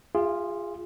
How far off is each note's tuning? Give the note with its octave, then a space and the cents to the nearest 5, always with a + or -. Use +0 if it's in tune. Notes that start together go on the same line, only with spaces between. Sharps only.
F4 +0 G#4 -25 E5 +35